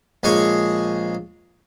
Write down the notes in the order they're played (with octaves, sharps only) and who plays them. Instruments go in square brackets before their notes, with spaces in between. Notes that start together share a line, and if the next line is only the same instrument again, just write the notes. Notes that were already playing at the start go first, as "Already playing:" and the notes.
[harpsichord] A#1 G#3 G#4 C#5 C#6